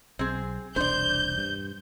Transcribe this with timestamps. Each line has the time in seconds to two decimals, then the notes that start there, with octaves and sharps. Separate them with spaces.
0.19 B1 C4 G#4
0.76 E1 C2 D4 C5 D5 G6
1.38 G2